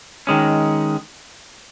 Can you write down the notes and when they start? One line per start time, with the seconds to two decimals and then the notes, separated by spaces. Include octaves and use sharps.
0.27 D#3 G#3 C#4